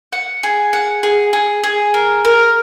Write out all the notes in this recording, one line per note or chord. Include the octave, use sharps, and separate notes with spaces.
F#5
G#4
F#5
G#4
G#4
G#4
A#4
A#4